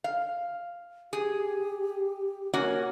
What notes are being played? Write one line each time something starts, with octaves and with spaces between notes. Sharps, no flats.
F5
G4 G#4
A#3 C#4 F#4